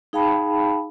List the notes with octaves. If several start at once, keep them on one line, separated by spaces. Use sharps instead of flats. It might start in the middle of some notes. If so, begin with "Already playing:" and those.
D#4 G#4 F5 G5 A5 B5